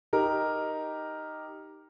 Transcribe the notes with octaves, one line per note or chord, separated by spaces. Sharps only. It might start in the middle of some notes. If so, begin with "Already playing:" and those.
D#4 G4 A#4